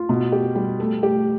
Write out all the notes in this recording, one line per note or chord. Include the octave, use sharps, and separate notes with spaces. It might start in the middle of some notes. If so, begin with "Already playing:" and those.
Already playing: F4
B2
G4
G3
A3
G4